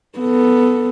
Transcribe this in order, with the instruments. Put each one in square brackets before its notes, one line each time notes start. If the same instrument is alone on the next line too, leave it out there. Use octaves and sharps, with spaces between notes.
[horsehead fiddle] B3 A4